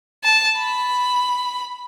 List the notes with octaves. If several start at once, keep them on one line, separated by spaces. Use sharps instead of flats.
A5
B5